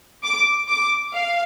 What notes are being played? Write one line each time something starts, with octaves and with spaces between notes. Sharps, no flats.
D6
D6
F5